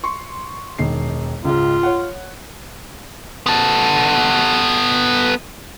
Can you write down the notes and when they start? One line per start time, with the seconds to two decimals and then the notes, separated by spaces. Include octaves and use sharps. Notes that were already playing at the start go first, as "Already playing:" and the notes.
0.04 C6 C#6
0.79 E1 D#3 C7
1.45 C#2 G#2 F4
1.83 C#5 F#5
3.46 B3 A4